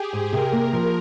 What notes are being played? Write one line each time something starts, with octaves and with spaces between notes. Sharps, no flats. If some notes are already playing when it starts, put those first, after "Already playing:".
Already playing: G4 G#4
G#2
C3 A#4
A#3
F3